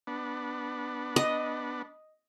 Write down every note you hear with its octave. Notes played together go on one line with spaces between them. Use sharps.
B3 D4
D#5